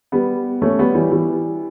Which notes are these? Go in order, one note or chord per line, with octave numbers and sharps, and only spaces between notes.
G3 B3
A3 C#4
G3 B3
E3 G3
E3 G3